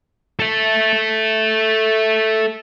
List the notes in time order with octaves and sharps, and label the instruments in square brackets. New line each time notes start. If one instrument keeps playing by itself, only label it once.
[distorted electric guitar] A4 E5